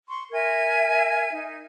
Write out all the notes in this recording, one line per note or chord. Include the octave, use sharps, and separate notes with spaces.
C6 C#6
A#4 E5 G#5 G#6
D#4